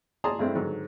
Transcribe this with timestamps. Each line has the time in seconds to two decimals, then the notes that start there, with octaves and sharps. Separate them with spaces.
0.24 G#4 D5 A5 A#5 C6 D#6
0.39 G2 G#3 A3 C4 D4 E4
0.55 G#2 D3 D#3 F#3